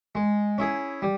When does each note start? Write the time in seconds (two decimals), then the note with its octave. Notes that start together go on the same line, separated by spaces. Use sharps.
0.15 G#3
0.58 C#4 E4 G#4
1.02 G3